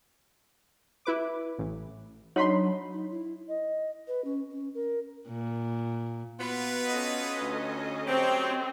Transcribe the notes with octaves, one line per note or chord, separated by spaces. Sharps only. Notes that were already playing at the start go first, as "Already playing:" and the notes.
E4 B4 D6
A1
F#3 D4 D#4 C#5 B5 C6
D#4
E4
D#5
B4
C#4
C#4
A#4
A#2
B3 F4 F#4 B4
C#4 A4 D#5
D2
F#3 C4 G4 C#5